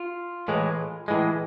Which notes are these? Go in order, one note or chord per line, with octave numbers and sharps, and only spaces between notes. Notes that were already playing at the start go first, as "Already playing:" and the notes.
Already playing: F4
A2 E3 G#3
A2 E3 G#3